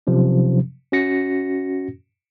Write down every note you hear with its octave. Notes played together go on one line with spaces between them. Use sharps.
C3 F3 F#3 C#4
C#4 F#4 A#6 C#7